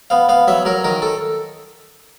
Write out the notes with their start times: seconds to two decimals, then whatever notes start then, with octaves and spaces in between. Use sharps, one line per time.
0.10 B3 F5
0.29 B3 F5
0.48 F#3 E5
0.65 F#3 A#4
0.84 D#3 A#4
1.02 A4